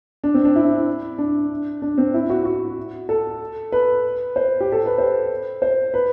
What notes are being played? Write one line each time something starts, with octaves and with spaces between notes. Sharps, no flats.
D4
C4
D4
E4
D4
D4
C4
E4
F#4
F#4
A4
B4
C5
G4
A4
B4
C5
C5
B4